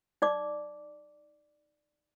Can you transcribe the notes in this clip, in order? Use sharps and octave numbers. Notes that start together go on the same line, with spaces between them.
D#4 D5 D6